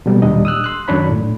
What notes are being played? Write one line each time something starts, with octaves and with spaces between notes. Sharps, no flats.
B2 F#3 G3 A3 A#3
D#2 A#2 G3 D4 D#5
D#6 E6 F#6
C6 F#6
F#2 D#3 D4 C#5 B5
A2